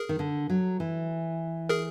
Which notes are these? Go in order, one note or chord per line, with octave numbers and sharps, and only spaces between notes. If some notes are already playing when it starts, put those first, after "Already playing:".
Already playing: G#4 A#4
D#3
D3
F#3
E3
G#4 A#4